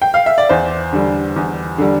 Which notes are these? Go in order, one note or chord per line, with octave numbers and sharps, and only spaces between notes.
G5
F5
E5
D5
E2 C5
D3 G3
E2
D3 G3